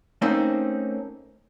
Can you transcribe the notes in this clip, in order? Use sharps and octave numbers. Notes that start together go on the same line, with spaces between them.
A3 A#3 C4 C#4 D#4 C5